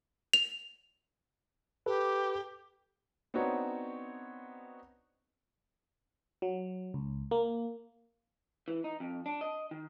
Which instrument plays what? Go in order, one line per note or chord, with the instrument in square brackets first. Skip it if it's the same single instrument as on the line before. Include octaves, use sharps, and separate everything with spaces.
[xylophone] F7
[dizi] G4 [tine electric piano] A4 B4
[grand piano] B3 C4 D4 D#4 F#4 C#5
[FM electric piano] F#3
C#2
A#3
[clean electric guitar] E3
D#4
F2
D4
D#5
D#3